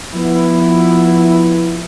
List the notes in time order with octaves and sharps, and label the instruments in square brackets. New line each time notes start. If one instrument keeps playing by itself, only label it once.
[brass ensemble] F3 B3 E4